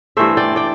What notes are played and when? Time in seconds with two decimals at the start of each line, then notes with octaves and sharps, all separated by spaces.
0.17 G2 E3 A3 C5 E5
0.37 D5 G5
0.56 D5 G5